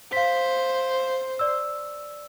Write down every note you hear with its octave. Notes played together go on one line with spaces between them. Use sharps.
C5 F5 B6
D5 E6